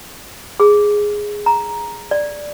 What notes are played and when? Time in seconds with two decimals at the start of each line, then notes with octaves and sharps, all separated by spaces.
0.60 G#4
1.46 A#5
2.11 D5